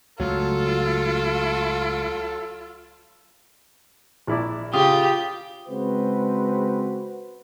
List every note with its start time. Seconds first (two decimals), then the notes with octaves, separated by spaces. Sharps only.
0.20 C#2 C#3 F#3 A3 F4 A4
4.27 A#1 E4 D5
4.74 C#3 F4 G4 D#6
5.68 C#3 G#3 C4 F#4 B4 C5